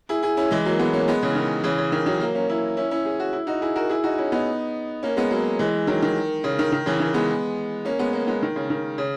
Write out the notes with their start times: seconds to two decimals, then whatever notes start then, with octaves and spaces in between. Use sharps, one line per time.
0.09 E4 G#4
0.23 E4 G#4
0.37 C#4 E4
0.51 E3 G#3
0.65 F#3 A#3
0.79 G#3 B3
0.93 A#3 C#4
1.08 G#3 B3
1.22 C#3 E3
1.36 D#3
1.64 C#3 E3
1.78 C#3
1.92 D#3
2.06 D#3 F#3
2.21 F#3 A#3
2.35 A#3 C#4
2.48 C#4 E4
2.77 C#4 E4
2.91 C#4 E4
3.05 G#4
3.20 F#4
3.33 E4
3.47 D#4 F#4
3.61 E4 G#4
3.76 F#4 A#4
3.89 E4 G#4
4.04 D#4 F#4
4.18 C#4 E4
4.32 B3 D#4
5.03 A#3 C#4
5.17 G#3 B3
5.31 F#3 A#3
5.59 E3 G#3
5.87 D#3 F#3
6.02 D#3
6.44 C#3
6.59 D#3
6.72 D#3
6.86 C#3 E3
7.00 D#3
7.14 G#3 B3
7.85 A#3 C#4
7.99 G#3 B3
8.13 A#3 C#4
8.27 G#3 B3
8.42 D#3
8.56 C#3
8.70 D#3
8.98 C#3